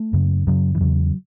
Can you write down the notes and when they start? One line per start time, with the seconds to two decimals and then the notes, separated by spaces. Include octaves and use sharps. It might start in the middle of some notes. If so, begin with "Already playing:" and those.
Already playing: A3
0.13 F#2 C#3
0.47 F#2 C#3 F#3
0.75 E3
0.80 E2 C#3 F#3